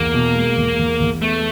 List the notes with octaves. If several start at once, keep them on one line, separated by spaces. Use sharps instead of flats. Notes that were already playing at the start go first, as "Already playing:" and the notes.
Already playing: E2 A#3
B2
G#3
E2
E2
E2
A3 B3